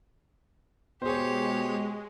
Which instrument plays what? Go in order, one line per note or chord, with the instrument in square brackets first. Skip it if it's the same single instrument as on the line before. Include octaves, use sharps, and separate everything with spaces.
[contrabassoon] B2 [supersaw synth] G#3 [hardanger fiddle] G4 C#5 [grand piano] G#4 C5